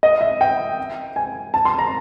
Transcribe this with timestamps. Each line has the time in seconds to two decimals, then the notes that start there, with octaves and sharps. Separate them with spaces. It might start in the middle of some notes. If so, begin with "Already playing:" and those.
0.03 D#5
0.21 E5
0.41 G5
1.16 G#5
1.54 A5
1.65 C6
1.79 A#5